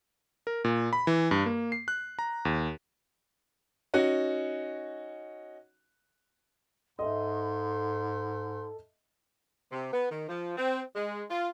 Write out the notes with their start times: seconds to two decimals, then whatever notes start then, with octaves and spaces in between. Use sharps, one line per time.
0.47 A#4
0.64 A#2
0.93 B5
1.07 E3
1.31 G2
1.46 A#3
1.72 C7
1.88 F#6
2.19 A#5
2.45 D#2
3.94 C#4 D#4 F#4
6.99 G#2 A4 D#5 E5 C6
9.71 C3
9.93 B3
10.11 D#3
10.28 F3
10.57 C4
10.95 G#3
11.30 F4